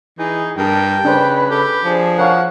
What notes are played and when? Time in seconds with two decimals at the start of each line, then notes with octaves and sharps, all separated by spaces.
0.19 E3 D#4 G#4
0.58 G2 A#4 G5 A5
1.05 C#3 D4 B4 C5
1.51 G4 A4
1.84 F3 D4 G#4
2.18 A#4 C#5 F5 F#5